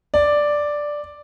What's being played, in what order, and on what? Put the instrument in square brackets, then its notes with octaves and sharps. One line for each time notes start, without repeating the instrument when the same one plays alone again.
[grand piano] D5